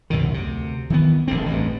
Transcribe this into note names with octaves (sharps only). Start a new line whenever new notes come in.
C2 F#2 B2 D#3
D2 C3
D#3 E3 G3 B3
E1 A#1 D3 C4
A1 G2